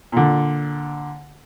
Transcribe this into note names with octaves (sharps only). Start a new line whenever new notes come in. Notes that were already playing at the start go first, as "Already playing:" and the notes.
A#2 D3